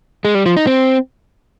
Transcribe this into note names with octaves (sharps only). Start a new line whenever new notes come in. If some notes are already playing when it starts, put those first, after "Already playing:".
G#3
G3
F3
D#4
C4